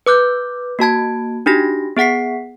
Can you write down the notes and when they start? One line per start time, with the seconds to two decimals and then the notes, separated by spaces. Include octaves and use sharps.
0.07 B4 D6 F#6 G6
0.79 A#3 F#4 A5 G#6
1.46 D4 D#4 F#4 G4 A#6
1.97 B3 G#4 F#5 B6 C7